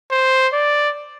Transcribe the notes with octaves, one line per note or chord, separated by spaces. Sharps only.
C5
D5